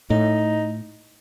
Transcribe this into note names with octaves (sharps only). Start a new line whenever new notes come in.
A2 D#4